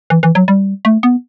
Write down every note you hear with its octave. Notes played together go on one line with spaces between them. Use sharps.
E3
E3
F#3
G3
A3
B3